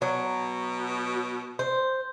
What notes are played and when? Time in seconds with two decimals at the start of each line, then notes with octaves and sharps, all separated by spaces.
0.02 B2 F#3
1.59 C5